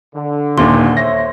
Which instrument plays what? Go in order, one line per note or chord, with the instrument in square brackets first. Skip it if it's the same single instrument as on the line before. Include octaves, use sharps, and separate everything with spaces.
[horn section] D3
[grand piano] D#1 D#2 [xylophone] C6
[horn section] C5 C#5 E5 [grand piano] A#6